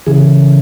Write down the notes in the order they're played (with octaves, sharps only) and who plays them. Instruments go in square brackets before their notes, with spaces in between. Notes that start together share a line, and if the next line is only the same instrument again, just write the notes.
[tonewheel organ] C#3 E3 G#4